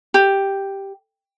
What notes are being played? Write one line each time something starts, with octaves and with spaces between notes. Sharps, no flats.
G4